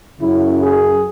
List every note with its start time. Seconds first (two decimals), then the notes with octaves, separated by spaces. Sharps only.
0.19 F#2 C#3 F#3 E4
0.60 G#4